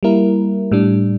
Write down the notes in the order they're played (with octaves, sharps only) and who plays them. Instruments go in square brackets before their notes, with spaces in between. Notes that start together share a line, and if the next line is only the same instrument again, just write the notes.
[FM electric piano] G3 A#3 E4 A#4
A2 G3 D4